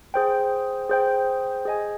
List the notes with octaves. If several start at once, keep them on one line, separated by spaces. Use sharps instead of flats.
G#4 C5 G5
G#4 C5 G5
G#4 D#5 G#5